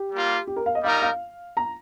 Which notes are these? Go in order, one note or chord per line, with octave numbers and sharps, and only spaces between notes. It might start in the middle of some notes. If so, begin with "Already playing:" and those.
Already playing: G4
G3 A#3 F4
G4
A#4
F5
D#5
G3 D#4 A#4 F5
F5
A#5